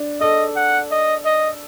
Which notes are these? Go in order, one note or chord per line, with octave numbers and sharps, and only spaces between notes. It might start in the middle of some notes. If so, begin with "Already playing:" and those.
Already playing: D4
A4 D#5
F#5
D#5
D#5